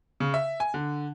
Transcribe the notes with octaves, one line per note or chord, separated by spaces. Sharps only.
C#3
E5
G#5
D3